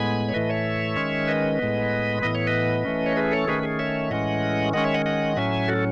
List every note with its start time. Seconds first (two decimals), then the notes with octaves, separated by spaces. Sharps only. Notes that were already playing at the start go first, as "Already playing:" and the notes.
Already playing: A2 G#3 B3 G#5 B5
0.29 C#5
0.34 A2 E3 A3 B4 D#5
0.49 C#5 E5
0.97 D#3 G#3 C#4
1.28 B4 D#5
1.59 A2 G#3 B3
2.22 A2 E3 B3 D#5
2.35 C#5
2.47 B4 D#5
2.85 E3 A3 C#4
3.06 C#5
3.17 G#4 B4
3.32 A4 C#5
3.48 D#3 A3 C#4 G#4 B4
3.63 G#4
3.79 C#5 E5
4.10 A2 E3 G#3 C#4 D#5 F#5
4.73 D#3 G#3 C#4 D#5 F#5
4.84 C#5 E5
4.94 D#5 F#5
5.06 D#5 F#5
5.36 A2 F#3 C#4 E5 G#5
5.68 F#4 A4